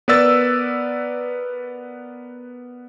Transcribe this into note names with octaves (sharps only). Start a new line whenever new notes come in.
B3 A#4 B4 D5 E6 A6